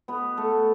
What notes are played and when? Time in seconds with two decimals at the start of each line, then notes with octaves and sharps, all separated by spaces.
0.08 B2 B3 B4
0.37 A3 A4